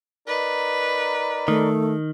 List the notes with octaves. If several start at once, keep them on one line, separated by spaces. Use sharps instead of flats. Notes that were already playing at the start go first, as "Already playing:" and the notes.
D#4 A#4 B4 D5
D#3 A3